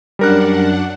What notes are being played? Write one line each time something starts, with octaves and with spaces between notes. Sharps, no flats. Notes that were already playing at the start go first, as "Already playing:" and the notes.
F#2 G3 D4 A#4 F#5 F#6